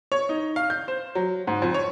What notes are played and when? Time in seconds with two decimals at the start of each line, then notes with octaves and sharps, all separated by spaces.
0.12 C#5
0.29 D#4
0.56 F5
0.70 G6
0.88 C5
1.15 F#3
1.47 G#2
1.62 F2
1.74 C#5